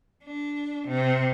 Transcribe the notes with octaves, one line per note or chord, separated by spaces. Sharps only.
D4
C3